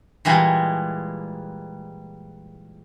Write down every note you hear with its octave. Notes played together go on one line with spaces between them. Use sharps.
A#2 E3 G3 G#3